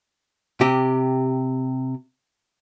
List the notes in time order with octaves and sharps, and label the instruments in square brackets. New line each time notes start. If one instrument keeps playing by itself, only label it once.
[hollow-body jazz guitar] C3 G4